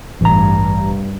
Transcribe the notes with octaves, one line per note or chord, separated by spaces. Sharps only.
A1 G2 A#5